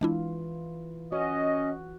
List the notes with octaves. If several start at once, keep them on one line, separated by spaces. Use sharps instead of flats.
E3 G#3 D4 E4 F4
C#4 F#4 D#5